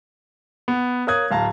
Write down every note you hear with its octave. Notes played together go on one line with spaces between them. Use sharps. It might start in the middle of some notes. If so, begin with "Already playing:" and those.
B3
A#4 C#5 F5 D#6 F#6 G#6
D1 F5 A5 A#5